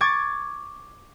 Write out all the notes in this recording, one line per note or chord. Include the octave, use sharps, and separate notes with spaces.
C#6 D6 G#6 A6